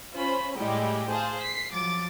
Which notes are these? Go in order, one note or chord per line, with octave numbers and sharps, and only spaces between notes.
C#4 F4 C5 B5
A2 G3 G#3 E4 G4
G#4 C5 F5 A5
B6 C7
F3 F#3 D6 A6